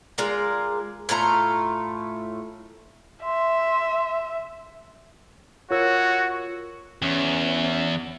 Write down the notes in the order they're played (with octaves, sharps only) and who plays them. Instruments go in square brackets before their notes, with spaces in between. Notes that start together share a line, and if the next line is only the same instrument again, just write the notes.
[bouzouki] G#3 F4 A#4 D5
A2 A3 F4 A#5
[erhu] E5 [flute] C6
[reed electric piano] F4 A#4 E6 [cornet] F#4 [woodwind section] C#5
[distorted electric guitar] E2 [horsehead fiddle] C#4